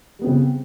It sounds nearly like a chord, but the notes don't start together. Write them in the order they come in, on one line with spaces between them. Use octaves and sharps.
G3 B3 C4 C#3